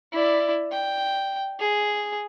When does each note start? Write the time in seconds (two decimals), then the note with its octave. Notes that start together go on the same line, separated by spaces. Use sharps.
0.13 E4 D5
0.72 G5
1.60 G#4